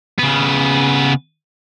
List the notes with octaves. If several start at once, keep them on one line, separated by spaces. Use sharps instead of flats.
C#3 B3